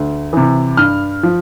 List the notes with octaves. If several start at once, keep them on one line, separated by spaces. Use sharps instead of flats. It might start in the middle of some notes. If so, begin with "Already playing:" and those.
Already playing: D2
C3 E3
G2 F6
F3